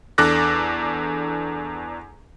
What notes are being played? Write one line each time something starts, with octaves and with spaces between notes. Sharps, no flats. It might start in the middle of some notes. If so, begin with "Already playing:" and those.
E2 D4 A4 D6 F#6 A#6